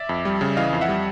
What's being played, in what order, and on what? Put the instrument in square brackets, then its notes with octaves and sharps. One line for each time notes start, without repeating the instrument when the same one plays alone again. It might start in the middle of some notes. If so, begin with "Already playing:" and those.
Already playing: [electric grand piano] D5 E5
F2
G3
C#3
E3 D#5 F5
F2
E5 F#5
G3